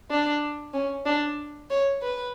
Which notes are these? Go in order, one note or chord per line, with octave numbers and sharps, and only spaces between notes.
D4
C#4
D4
C#5
B4